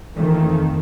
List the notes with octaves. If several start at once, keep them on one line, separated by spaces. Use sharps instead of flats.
F2 D#3 E3 A3 A#3